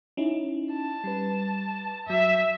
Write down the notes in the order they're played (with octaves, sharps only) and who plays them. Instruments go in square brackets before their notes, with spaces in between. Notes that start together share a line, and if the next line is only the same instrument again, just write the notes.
[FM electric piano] C#4 D#4 E4
[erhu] A5
[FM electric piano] G3 B4
[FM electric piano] F#2 F#3 [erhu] E5